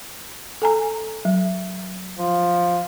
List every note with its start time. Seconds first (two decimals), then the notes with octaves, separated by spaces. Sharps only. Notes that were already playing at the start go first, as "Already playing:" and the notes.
0.62 A4 G#5 A#5
1.25 F#3
2.19 F3